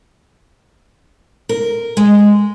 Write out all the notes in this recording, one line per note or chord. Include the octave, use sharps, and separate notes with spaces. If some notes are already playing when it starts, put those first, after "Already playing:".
A#4
G#3